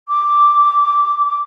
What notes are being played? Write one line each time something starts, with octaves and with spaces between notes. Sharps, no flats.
D6